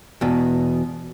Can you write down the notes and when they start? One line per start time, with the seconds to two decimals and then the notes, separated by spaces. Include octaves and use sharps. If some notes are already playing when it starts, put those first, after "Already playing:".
0.21 E2 B2